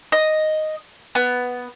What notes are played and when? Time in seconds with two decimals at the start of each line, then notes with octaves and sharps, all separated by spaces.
0.12 D#5
1.15 B3